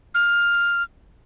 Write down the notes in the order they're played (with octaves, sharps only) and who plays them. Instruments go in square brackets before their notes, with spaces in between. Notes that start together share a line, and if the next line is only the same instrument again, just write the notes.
[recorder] F6